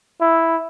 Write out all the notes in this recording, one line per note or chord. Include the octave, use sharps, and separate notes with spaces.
E4